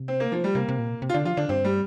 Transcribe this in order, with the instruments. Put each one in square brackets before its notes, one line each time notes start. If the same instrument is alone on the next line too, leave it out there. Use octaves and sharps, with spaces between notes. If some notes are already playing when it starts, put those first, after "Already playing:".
Already playing: [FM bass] C3
[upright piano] C4
A#3
F3
G3
[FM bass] C3 [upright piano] A#3
[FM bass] C3
A#2
C3
[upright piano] F4
[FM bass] D3 [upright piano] D4
[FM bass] F3 [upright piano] F4
[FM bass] D3 [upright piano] D4
[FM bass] G2 [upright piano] C4
[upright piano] G3